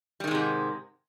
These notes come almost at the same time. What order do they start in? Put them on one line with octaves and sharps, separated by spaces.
G3 D#3 G#3 C3 G#2